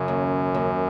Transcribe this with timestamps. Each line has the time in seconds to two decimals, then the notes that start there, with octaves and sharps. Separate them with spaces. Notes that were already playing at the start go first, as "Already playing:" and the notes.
Already playing: F#2 C#3
0.08 D#2
0.55 D#2